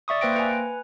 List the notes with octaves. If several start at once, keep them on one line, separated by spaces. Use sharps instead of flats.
D5 E5 C#6 D#6
A#3 B4 C5 G5 A#6 D7
B4 G#5